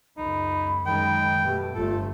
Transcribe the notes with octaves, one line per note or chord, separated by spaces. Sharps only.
C#2 F#2 D#4 B5
F#2 D#3 G#3 G5
B2 A3 G4
G1 G2 A3 F4 A4